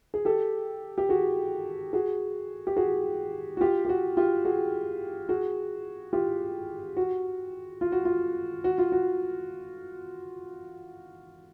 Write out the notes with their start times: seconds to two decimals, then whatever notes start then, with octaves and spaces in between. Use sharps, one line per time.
0.14 G#4
0.25 G4 A4
0.98 G4
1.09 F#4 G#4
1.93 F#4 G#4
2.67 G4
2.77 F#4 G#4
3.57 F#4
3.61 F4 G4
3.85 G4
3.89 F#4
4.17 F4 G4
4.45 F#4 G#4
5.29 F#4 G#4
6.13 F4 G4
6.97 F#4
7.81 F4
7.92 F#4
8.05 F4
8.64 F#4
8.78 F4
8.92 F#4